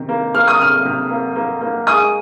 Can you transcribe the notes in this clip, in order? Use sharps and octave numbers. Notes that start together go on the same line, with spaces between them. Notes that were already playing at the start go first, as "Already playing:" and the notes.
Already playing: C3 D#3
A#3
A#3 F6
D#6
C3 F6
C3
A#3
A#3
A#3
G#3 D#6